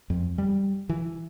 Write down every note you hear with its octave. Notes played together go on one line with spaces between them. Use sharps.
F2
G3
E3